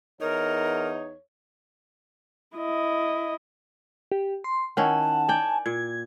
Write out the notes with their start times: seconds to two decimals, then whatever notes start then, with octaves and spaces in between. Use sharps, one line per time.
0.21 E2 D#4 A#4 C#5
2.56 E4 D#5
4.12 G4
4.44 C6
4.77 D#3 C#4 E4 F#5 A5
5.29 D5 G5 G#5
5.66 A#2 G#6